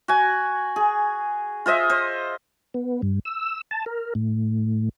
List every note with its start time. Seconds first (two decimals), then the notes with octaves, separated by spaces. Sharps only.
0.08 F#4 G#5
0.76 G#4
1.66 F4 C5 D#5 E5
1.90 C5
2.74 B3
3.02 G2
3.25 E6
3.71 A5
3.86 A#4
4.15 A2